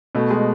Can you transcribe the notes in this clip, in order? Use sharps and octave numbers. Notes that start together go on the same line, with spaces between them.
B2 A3
G#3